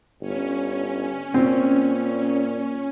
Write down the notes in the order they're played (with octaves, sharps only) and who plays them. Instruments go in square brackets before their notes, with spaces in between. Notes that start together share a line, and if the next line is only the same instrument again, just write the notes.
[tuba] G1 [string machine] C#4
[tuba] A#2 [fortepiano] C4